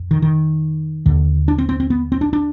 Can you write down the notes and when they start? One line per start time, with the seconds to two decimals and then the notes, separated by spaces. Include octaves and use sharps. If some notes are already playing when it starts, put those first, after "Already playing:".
Already playing: F2
0.11 D#3
0.22 D#3
1.06 D#2 D3
1.48 D4
1.58 C4
1.69 C4
1.80 C4
1.90 B3
2.12 C4
2.21 D4
2.33 D4